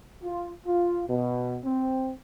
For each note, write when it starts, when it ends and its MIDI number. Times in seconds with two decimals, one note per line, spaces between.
0.24 0.49 65
0.66 1.02 65
1.08 1.57 47
1.65 2.10 60